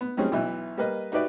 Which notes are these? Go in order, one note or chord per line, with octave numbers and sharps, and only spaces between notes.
B3
D#3 F#3 G3 C4 C#4 G#4
B1 B2 E3 E5
G3 A#3 B4 D#5
D#4 F#4 G4 B4 D5 E5